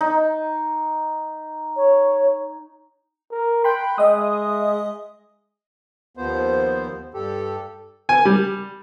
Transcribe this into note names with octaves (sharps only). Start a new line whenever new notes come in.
D#4
C#5
A#4
G5 B5 C6 F#6
G#3 D#5 E5 D#6
D#2 F3 B3 C5
G2 G4 A4
G#5
G3